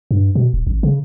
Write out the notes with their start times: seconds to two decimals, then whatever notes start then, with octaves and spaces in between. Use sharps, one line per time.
0.11 G2
0.35 B2
0.54 D#1
0.67 A1
0.83 C#3